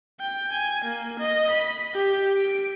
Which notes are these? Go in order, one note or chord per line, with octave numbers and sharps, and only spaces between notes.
G5
G#5
A#3
D#5
B5
G4
D7